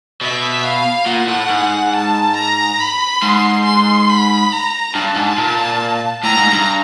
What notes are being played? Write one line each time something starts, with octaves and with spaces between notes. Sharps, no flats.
B2 E5
F5
A#2 F#5
A2
G#2
A5
A#5
B5
G#2 C6
C6
B5
A#5
G2 A5
G#2
A#2
A2 A#5
G#2
G2